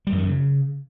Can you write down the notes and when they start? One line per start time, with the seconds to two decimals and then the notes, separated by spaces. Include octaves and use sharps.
0.07 G3
0.12 F#2
0.18 D#3
0.23 F#2
0.28 C#3